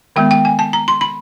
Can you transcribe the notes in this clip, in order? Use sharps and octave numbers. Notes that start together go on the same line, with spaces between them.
D#3 G#3 B3 G5
G5
G#5
A5
A#5
C6
B5